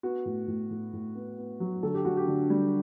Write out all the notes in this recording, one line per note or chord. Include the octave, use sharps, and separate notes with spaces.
B3 F#4
A2
A2
A2
A2
B3
B3
F#3
D3 A4
G4
D3 F#4
G4
D3
G3